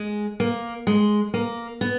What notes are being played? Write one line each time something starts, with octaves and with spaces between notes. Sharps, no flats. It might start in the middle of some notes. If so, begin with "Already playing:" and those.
Already playing: G#3
A#3
G#3
A#3
B3